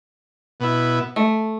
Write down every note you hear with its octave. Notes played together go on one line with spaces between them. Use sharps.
B2 B3 E4
A3